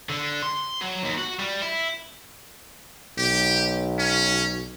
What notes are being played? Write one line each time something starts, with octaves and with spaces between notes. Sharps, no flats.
D3
C6
F#3
D#2
F#4
G3
E4
B1 G4
C#4